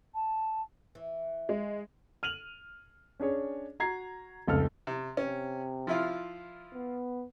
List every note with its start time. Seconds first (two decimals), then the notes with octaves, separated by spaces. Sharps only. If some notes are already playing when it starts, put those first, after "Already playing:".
0.14 A5
0.95 E3
1.49 G#3
2.23 F6 D#7 F7 F#7
3.20 C#4 D4 G#4 C#5
3.80 F#4 A#5 G#6 C7
4.48 F1 C#2 A4 F6
4.87 C3
5.17 C3 C#4
5.87 F3 E4 F4
6.74 B3